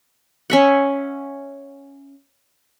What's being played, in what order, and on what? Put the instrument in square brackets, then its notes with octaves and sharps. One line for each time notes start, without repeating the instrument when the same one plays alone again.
[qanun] C#4 E5 F#5